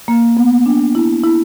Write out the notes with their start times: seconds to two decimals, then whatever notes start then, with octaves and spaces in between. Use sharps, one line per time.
0.08 A#3
0.37 B3
0.66 D4
0.95 E4
1.23 E4